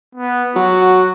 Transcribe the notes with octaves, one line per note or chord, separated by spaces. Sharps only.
B3
F#3 F#4